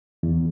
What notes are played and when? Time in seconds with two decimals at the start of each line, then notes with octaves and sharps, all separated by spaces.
0.23 E2